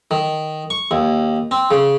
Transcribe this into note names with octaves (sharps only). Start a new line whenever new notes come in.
D#3
C#6
D#2
C4
C#3